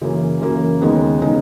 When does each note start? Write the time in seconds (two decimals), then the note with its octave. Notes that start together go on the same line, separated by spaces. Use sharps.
0.02 F#2 C#3 E3 A#3
0.41 F#2 C#3 E3 A#3
0.81 D#2 C#3 G#3 B3 D#4
1.22 C#3 G#3 B3 D#4